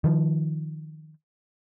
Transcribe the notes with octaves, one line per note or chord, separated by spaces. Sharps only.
D#3 F3